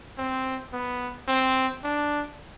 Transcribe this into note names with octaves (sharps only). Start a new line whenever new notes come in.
C4
B3
C4
D4